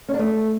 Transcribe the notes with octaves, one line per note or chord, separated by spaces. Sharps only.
C#4
D4
A3